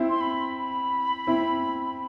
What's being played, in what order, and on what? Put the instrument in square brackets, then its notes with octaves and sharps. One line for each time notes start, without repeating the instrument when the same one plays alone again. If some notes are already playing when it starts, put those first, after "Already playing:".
Already playing: [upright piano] C4 E4
[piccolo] C6
B5
B5
[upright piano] C4 E4